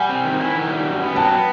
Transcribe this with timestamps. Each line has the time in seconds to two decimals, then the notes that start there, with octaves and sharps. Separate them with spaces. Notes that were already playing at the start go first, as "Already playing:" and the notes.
Already playing: G3 F#5 G#5
0.09 C4
0.25 D#3
0.40 E4
0.55 D#3
0.70 G3
0.85 F#2
1.01 B3
1.15 F#3 G5 A5
1.31 B3